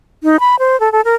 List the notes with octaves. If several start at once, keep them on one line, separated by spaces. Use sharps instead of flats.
D#4
B5
C5
A4
A4
A#4